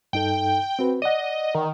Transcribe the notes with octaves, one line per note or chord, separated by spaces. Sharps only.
G2 D#4 A4 G5
C4 F#4 B4
D5 D#5 F#5
D#3